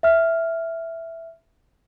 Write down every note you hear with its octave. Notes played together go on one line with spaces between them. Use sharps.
E5 F6